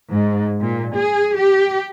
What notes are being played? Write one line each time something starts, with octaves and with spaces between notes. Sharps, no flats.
G#2
A#2
G#4
G4